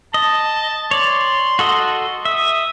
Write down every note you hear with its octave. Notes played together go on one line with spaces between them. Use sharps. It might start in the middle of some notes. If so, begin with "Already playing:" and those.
D#5 A5
C#5 D5 C6
F#4 A4 D#5
E5 D#6